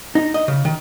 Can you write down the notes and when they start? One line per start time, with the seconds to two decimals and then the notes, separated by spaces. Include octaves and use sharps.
0.15 D#4
0.34 D#5
0.48 C#3
0.65 D#3